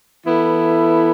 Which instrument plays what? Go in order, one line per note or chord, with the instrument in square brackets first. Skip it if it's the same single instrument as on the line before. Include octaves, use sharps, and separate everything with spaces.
[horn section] E3 B3 E4 A4